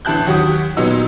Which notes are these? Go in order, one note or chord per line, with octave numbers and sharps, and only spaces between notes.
A1 D3 E4 A5 F#6 G6
D#2 F#3 F#4 G4 D#6
A#2 F#3 B3 D#4 E6